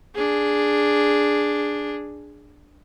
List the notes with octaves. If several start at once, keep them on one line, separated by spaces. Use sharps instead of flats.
D4 G#4